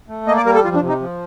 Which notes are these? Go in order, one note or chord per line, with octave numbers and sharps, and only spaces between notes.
A3
A#3 D#5
D5
G3 A#4
A4
F2 F4
D4
C3
D#4
F3